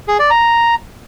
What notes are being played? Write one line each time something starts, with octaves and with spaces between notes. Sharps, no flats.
G#4
D5
A#5